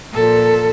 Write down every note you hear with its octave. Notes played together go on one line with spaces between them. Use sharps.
A#2 F3 A4